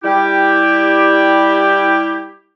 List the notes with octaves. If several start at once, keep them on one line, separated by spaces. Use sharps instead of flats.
G3 E4 G4